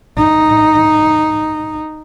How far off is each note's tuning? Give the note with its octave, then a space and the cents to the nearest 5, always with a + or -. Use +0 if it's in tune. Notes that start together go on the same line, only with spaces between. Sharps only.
D#4 -5